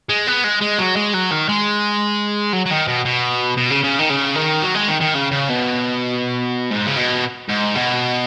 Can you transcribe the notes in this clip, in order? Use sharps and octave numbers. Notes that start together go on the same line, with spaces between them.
G#3
B3
G#3
G#3
F#3
G#3
F#3
D#3
G#3
F#3
F#3
D#3
B2
B2
B2
C#3
C#3
D#3
C#3
D#3
F#3
G#3
D#3
D#3
C#3
C#3
B2
G#2
C#3
B2
G#2
B2